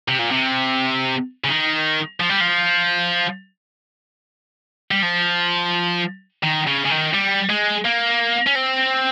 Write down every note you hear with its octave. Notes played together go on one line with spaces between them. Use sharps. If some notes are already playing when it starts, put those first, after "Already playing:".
C3
A#2
C3
C#3
D#3
F3
G3
F3
G3
F3
D#3
C#3
C#3
D#3
G3
G#3
A#3
C#4
C4